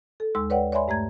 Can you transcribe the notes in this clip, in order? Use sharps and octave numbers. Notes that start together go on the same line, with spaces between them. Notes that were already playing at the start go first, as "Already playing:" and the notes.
A4
D#2 G#3 C6 E6
B4 C#5 D5 F#5 G5
C#5 D5 E5 G#5 B5 C6
G2 A3 A#5 G#6